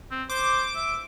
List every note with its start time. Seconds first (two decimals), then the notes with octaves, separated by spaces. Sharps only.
0.11 C4
0.30 C5 D6
0.75 E5